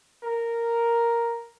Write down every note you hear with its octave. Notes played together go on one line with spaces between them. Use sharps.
A#4